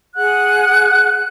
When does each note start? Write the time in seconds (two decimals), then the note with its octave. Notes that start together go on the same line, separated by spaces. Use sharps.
0.15 G#4 F#5 F#6